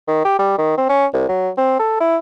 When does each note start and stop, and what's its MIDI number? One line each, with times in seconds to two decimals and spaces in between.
0.08 0.24 51
0.25 0.36 67
0.39 0.56 55
0.58 0.75 51
0.78 0.85 60
0.89 1.06 61
1.14 1.27 36
1.29 1.49 54
1.58 1.75 60
1.79 1.99 69
2.00 2.17 64